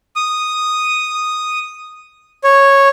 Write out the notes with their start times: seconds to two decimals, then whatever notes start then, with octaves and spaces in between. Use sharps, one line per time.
0.16 D#6
2.44 C#5